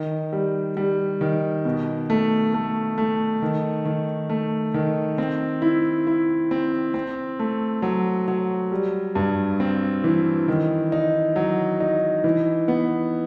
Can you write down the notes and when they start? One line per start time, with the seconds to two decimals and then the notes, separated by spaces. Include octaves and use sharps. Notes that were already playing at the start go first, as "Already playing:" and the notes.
Already playing: D#3
0.33 G3
0.77 G3
1.21 D#3
1.65 B2
2.10 A3
2.54 A3
2.98 A3
3.42 D#3
3.85 D#3
4.30 A3
4.74 D#3
5.18 C4
5.62 E4
6.07 E4
6.51 C4
6.94 C4
7.39 A3
7.82 F#3
8.28 F#3
8.72 G3
9.15 G2
9.60 C4
10.04 E3
10.48 D#3
10.92 D#4
11.36 F#3
11.80 D#4
12.24 E3
12.68 B3